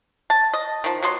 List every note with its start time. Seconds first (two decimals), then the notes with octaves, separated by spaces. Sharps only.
0.30 A5
0.54 D#5
0.84 D#3 F3
1.03 F#3 B3 C6